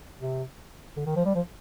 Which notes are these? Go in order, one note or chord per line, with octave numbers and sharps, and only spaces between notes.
C3
D3
D#3
F3
G3
F3